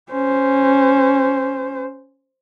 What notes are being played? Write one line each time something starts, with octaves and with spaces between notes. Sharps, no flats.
C#4 C5